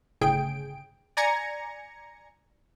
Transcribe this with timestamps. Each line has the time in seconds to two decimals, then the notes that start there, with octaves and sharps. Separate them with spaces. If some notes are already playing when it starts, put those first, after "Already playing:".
0.21 G1 A2 C#3 G#4 G5 D7
1.17 D5 G#5 A#5 G#6 A#6 C#7